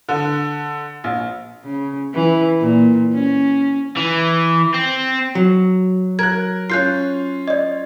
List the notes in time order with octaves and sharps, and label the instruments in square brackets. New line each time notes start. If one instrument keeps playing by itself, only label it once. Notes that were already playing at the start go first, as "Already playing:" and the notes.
[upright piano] D3
A#1
[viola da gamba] C#3
E3
A#2
C#4
[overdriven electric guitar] E3
C4
[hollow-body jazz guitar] F#3
[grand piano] A#4 F#6 [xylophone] G#6
[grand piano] C#4 F4 [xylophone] F#6 G6 C7
[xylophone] D5 D#5